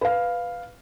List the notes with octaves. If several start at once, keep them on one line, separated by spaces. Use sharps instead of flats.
B4 F5